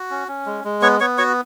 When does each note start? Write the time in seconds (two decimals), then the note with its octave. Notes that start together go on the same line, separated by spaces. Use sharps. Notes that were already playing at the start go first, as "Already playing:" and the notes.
Already playing: F#4
0.10 C#4
0.28 C#4
0.46 G#3
0.64 G#3
0.82 B3 C#5 C#6
1.00 B3 C#5 C#6
1.18 F#4 C#5 C#6